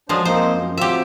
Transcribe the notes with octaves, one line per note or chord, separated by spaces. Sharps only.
F3 F#3 G#3 D4 C5
A#3 C4 D#4 C5
F#2
F#3 C4 F4 G4 E5